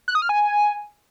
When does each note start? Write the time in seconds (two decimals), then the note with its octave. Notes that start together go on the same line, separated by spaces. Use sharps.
0.08 F#6
0.15 D#6
0.22 F6
0.29 G#5